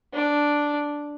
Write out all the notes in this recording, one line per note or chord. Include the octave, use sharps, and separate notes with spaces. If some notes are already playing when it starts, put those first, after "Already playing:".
D4